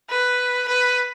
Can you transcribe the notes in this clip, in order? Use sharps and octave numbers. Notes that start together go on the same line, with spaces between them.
B4
B4